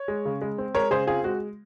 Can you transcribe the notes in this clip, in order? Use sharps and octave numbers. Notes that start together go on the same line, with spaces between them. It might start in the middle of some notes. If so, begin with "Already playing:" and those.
Already playing: C#5
G#3
C#3
G#3
C4
G#3 A#4 C#5
C#3 G#4 C5
C4 F4 G#4
G#3 F#4